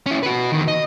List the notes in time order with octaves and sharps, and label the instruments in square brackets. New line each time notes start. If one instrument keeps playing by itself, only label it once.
[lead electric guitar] C#4 E4
F#4 B4
E2 D#3
D#5